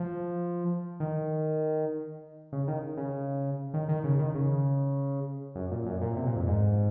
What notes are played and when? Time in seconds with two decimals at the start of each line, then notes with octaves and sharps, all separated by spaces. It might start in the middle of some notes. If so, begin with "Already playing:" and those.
Already playing: F3
1.00 D#3
2.53 C#3
2.68 D#3
2.97 C#3
3.74 D#3
3.89 D#3
4.04 C#3
4.19 D#3
4.35 C#3
5.55 F#2
5.71 A#2
5.86 F#2
6.01 A#2
6.16 C3
6.26 A#2
6.36 F2
6.47 G#2